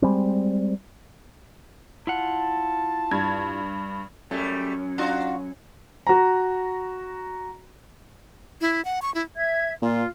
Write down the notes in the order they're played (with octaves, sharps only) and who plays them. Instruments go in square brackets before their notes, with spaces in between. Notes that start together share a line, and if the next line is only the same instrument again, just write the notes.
[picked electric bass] G3 G#3 C4
[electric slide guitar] E4 F4 F#5 [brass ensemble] A5
[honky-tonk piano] G2 G#6
[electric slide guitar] F#3 C#4 [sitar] G3 A3
[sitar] D4 F4 F#4
[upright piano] F#4 A#5
[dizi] E4
F#5
C#6
E4
[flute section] E5 G#6
[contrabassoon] A#2 [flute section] F4